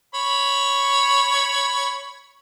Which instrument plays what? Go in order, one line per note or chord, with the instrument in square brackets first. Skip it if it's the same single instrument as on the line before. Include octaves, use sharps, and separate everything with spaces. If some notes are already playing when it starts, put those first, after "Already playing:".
[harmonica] C#5 B5